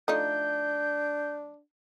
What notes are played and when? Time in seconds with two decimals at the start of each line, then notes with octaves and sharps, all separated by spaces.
0.08 F3 A3 D4 D#4 G6